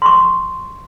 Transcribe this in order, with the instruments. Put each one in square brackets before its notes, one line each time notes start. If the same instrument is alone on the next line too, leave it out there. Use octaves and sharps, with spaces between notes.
[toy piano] C6 C#6